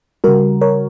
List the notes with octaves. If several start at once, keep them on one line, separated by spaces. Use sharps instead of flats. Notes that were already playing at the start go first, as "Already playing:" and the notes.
C#3 G3 F#4 A#4
A#4 C#5